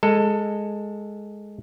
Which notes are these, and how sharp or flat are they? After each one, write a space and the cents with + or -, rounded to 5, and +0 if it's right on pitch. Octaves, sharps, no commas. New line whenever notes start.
G#3 +0 A4 +15